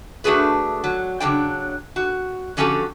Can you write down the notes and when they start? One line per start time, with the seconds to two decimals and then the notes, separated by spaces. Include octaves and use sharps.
0.24 A3 D4 F#4 G#4 B4
0.84 F#3
1.20 C#3 F#3 D4 G5
1.96 F#4
2.57 D3 F3 C#4 F#4 G4 A4